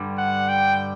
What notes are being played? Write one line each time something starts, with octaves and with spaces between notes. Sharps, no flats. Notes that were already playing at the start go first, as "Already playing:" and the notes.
Already playing: G2 D3 G3
F#5
G5